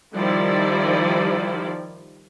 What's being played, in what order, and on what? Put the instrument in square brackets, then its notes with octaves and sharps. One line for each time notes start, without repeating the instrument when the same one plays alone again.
[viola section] D#3 F3 G3 E4 D5